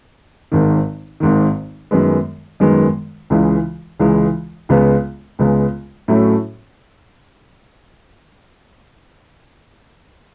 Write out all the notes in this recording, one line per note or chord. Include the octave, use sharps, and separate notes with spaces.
G#1 G#2 D#3
G#1 G#2 D#3
F#2 D#3 G#3 B3
F#2 D#3 G#3 B3
C#2 C#3 E3 G#3
C#2 C#3 E3 G#3
C#2 C#3 G#3 B3
C#2 C#3 G#3 B3
A2 F#3 A3 C#4 F#4